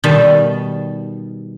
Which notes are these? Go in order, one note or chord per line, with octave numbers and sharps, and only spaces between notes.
B2 D#3 G3 A5